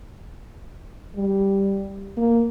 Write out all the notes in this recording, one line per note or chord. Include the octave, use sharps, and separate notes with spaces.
G3
A#3